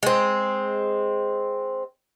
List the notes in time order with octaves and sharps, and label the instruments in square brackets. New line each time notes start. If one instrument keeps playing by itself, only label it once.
[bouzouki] G#3 C4